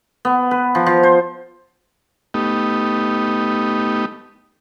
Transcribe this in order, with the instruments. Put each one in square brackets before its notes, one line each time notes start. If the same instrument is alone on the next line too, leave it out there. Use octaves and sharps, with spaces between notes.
[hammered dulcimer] B3
B4
F3
F3
C5
[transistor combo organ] A3 B3 D#4 G4